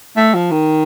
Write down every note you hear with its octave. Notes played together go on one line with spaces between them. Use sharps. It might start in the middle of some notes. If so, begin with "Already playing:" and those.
A3
F3
D#3